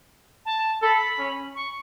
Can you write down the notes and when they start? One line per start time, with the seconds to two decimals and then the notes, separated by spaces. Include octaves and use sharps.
0.45 A5
0.82 A4 B5
1.19 C#4
1.55 C#6